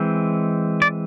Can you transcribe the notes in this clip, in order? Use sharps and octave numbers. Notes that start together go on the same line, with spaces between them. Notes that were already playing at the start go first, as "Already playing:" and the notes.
Already playing: E3 G#3 C4
D5